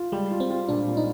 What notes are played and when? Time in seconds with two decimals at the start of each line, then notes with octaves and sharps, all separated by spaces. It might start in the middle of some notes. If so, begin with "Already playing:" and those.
Already playing: F4
0.12 G3 G#3
0.31 F4
0.40 C4
0.50 F4
0.69 A#2 D4
0.88 A#2
0.97 D#4